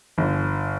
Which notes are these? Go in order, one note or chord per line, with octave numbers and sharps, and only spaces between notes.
G1